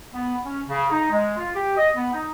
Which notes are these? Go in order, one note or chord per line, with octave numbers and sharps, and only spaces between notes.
B3
C#4
C#3
D#4
G#3
F4
G4
D#5
B3
D#4